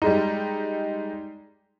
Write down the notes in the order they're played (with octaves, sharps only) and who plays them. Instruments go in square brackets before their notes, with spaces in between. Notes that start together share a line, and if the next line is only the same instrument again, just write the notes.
[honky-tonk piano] G3 G#3 D#4